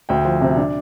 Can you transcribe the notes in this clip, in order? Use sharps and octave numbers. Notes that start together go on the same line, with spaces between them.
D2 G5
F3
C3
D4